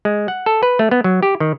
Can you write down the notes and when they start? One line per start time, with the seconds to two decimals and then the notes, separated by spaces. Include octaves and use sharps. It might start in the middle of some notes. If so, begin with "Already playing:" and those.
0.05 G#3
0.28 F#5
0.46 A4
0.63 B4
0.79 A3
0.91 B3
1.04 F#3
1.23 G4
1.40 D#3